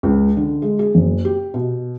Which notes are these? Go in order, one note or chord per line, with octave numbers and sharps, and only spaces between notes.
C#2
D3
G#3
G#4
F#1
G4
B2